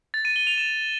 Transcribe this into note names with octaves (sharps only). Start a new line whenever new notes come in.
A6
D#7
G7
F7
E7